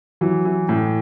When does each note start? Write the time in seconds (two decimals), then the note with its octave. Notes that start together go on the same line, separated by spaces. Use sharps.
0.21 E3 F#3
0.45 E3
0.69 A2